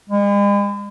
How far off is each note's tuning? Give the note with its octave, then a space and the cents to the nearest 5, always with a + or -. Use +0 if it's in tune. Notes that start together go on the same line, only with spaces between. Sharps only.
G#3 -45